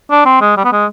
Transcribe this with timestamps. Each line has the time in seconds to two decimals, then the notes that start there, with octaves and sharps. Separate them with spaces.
0.11 D4
0.25 C4
0.41 G#3
0.57 G3
0.64 B3
0.72 G#3